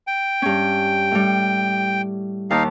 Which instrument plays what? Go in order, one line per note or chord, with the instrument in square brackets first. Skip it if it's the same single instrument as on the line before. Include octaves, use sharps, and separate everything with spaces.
[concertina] G5
[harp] G2 C#4
A2 G3
[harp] D#2 A5 [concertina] D#4 F5